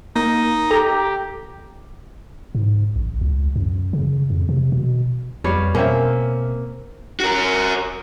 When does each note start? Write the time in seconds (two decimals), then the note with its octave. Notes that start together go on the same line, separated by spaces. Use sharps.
0.16 A#3 D#4
0.71 G4 A4 A#5
2.55 G#2
2.96 A1
3.21 C#2
3.56 F#2
3.93 C#3
4.30 F2
4.49 C3
4.72 B2
5.44 F2 G3 B4 C#5 F5
5.75 B2 A#3 C4 C#4 E5
7.20 F#4 A#4